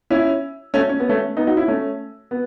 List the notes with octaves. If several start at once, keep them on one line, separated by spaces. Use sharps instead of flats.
C#4 E4
A3 C#4
C#4
B3
A3 C#4
B3 D#4
D#4 F#4
C#4 E4
A3 C#4
B3